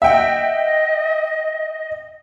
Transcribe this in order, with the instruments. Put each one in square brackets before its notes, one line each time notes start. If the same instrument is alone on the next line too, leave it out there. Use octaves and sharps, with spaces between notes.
[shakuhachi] D#5 [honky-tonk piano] E5 F#5 G5